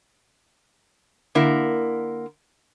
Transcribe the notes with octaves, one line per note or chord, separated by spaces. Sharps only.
D3 A#3 E4 A#4